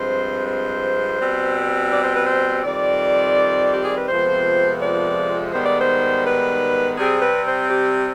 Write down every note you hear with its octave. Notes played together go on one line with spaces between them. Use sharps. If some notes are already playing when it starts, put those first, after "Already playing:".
Already playing: G2 F3 G#3 C4 C5
C5
B2 G3 C4
D5
C5
B4
C5
F2 D#3 G3 C4 D5
G4
G#4
B4
F2 C3 F3 G#3 B3 C5
D5
G#2 D#3 G3 B3 C5
D5
C5
B4
C3 G3 C4 G#4
B4
C5
G4